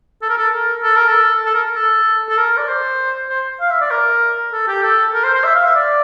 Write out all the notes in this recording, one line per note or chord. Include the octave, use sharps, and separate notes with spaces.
A4
A#4
A4
A#4
A4
A#4
A4
A4
A#4
A4
A4
A#4
D5
C5
C5
F5
E5
D5
A#4
A4
G4
A4
A#4
C5
C5
E5
F5
E5
D5